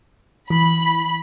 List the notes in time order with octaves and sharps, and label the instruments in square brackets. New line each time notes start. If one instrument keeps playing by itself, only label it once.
[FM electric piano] E3 [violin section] B5